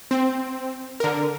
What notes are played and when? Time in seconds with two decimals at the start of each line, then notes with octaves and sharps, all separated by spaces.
0.11 C4
1.00 D3 A#4